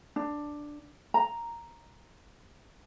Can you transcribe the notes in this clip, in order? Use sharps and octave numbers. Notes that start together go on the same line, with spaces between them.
D4
A#5